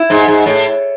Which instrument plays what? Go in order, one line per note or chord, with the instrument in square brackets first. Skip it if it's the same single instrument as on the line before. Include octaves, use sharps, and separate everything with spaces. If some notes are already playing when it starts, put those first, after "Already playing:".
Already playing: [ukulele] E4
[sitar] G#2
G#2
A2